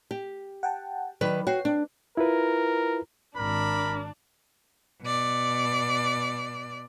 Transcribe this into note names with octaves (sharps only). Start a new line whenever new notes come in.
G4
F#5 G5 A5
D#3 F#3 B4 D5 B5
F#4 C#5 G5 C7
D4
E4 F4 A#4 B4
G#1 D4 A#4 B5
B2 D5